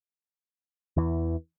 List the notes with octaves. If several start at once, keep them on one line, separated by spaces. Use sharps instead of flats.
E2 E3